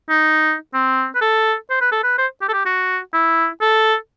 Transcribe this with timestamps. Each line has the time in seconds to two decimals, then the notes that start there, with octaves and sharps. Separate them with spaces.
0.09 D#4
0.73 C4
1.15 B4
1.21 A4
1.70 C5
1.81 B4
1.92 A4
2.03 B4
2.18 C5
2.41 G4
2.49 A4
2.53 G4
2.65 F#4
3.13 E4
3.61 A4